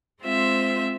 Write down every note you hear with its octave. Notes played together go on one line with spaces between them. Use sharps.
G#3 C4 F4 C5 E5